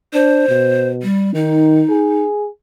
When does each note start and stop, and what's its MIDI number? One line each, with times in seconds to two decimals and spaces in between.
0.14 0.47 62
0.14 0.89 72
0.49 1.04 47
1.03 1.34 55
1.35 1.83 51
1.35 2.23 63
1.90 2.48 68